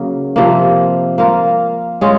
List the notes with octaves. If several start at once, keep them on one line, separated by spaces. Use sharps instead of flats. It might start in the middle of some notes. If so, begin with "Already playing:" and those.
Already playing: C#3 F#3 A#3
C3 F3 A#3
A#3 F4 A#4
G#3 C#4 F4 G#4